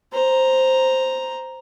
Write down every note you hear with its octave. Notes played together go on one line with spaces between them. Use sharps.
C5 A#5